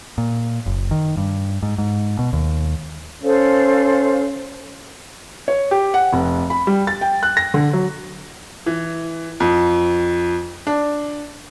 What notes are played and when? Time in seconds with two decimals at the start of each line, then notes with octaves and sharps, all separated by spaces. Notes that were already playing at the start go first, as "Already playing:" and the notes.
0.18 A#2
0.66 F#1
0.91 D#3
1.17 G2
1.63 G#2
1.78 G#2
2.19 B2
2.33 D#2
3.23 C#4 A4 C5 F5
5.48 C#5
5.71 G4
5.94 F#5
6.13 F1
6.50 B5
6.67 G3
6.87 A6
7.01 G5
7.23 F#6
7.37 A#6
7.54 D3
7.73 F#3
8.66 E3
9.40 F2
10.67 D4